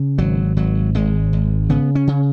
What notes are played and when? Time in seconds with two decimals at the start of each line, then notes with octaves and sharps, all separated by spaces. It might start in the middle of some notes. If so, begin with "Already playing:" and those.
Already playing: C#3
0.18 G#1 F#3
0.57 G#1 F#3
0.95 G#1 G#3
1.33 G#1
1.70 C#3 B3
1.95 C#4
2.07 C#3